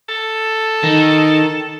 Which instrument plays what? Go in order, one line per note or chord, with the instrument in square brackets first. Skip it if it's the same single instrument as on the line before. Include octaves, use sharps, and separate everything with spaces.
[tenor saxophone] A4
[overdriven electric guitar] D#3